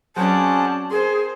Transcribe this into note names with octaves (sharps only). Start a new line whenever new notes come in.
F#3 C4 C#4 F#4 G#4 C5 D5 A5
C4 G#4 A#4 C5 C6